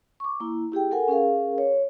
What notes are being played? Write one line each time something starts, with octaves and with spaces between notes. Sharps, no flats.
C#6 D6
A#3 E4
E4 G4 G#4 G5
A4 A#4 F#5 G#5
C#4 G#4 A#4 F5
C#5